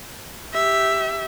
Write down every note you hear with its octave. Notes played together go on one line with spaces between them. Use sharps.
G4 E5